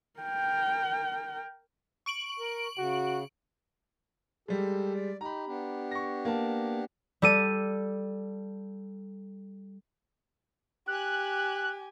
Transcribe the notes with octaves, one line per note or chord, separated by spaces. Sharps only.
A#4 G5
C#6 D7 F#7
A#4
C#3 F#4
G3 G#3 G4 A4
D5
D#4 G4 A#5 B5
B3 D4 G4
C#6 A#6
A#3 A5
G3 A4 D#7
G4 G#5 F#6